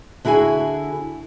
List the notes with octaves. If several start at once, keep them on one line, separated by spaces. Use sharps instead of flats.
D3 E4 F#4 G#4 G#5